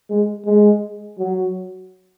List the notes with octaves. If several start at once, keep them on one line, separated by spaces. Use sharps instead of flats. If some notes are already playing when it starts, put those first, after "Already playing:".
G#3
G#3
F#3